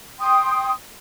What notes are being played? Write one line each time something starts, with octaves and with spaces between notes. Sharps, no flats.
G5 C6 D#6